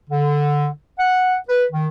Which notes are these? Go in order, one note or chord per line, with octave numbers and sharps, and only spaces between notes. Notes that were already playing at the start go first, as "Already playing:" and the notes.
D3
F#5
B4
D#3